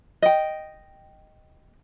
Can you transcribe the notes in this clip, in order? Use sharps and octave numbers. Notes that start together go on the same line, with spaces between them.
D#5 G5